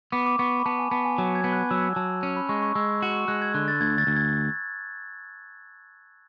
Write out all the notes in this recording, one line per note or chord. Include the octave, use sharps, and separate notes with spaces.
B3 D6
D6
B3 C#6
B5
B3 A5
G#5
B3 A5
G#5
F#3 A5
G#6
B3
F#6
F#3 E6
F#3 A5
C#4
B5
G#3 C#6
C#6
G#3 E6
F#4
G#3 F#6
G#6
D3 F#6
A6
D2 G#6
A6
D2
G#6